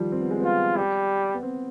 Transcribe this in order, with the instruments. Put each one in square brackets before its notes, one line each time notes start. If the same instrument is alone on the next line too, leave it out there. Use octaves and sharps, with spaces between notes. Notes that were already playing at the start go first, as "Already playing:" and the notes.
Already playing: [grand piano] D#3 F3 G3
C4
B3
G#3
[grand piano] B3 [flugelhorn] F4
[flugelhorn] G3
[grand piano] B3
C4